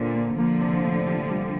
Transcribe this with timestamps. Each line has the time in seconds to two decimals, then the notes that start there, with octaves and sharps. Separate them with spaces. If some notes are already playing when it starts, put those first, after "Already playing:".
Already playing: A#2 D3 C4
0.15 A#3
0.38 D3 F3 A#3
0.60 C3
0.84 A2
1.07 G4
1.30 G3